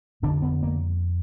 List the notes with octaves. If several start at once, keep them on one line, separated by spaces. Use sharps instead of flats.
F2 D3 D4
B3
A#3